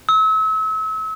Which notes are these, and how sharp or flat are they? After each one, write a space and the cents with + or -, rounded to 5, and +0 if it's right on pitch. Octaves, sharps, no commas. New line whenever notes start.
E6 -35